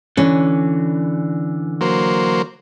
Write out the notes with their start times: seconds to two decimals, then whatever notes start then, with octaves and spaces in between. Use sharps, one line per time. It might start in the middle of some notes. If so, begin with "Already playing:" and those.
0.17 D3 E3 C#4
1.81 F#3 A#3 C5